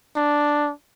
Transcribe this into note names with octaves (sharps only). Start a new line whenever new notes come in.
D4